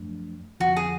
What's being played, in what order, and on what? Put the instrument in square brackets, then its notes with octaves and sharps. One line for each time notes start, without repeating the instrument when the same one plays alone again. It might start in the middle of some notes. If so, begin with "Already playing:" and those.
Already playing: [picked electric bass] F#2 F3 A3 D4
[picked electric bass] F2 D3 F3 [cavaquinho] F#4
[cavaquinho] G#4